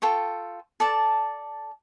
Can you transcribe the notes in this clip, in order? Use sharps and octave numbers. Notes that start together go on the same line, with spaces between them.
F4 A4 G5 C#6
A4 D5 A5